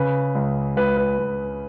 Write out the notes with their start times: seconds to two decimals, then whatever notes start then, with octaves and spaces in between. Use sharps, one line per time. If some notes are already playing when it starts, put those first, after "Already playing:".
Already playing: C#3 B4
0.35 C#2
0.76 C#2 B4
0.97 B4
1.19 C#2